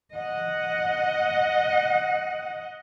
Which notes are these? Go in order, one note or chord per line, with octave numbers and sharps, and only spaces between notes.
D#5 F#5